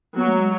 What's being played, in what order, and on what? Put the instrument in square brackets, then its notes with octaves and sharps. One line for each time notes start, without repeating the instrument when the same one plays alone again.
[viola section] F#3 [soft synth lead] B3
[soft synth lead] A3
G#3